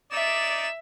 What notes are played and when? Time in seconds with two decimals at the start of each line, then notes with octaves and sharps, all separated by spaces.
0.12 D#4 D5 E5 E7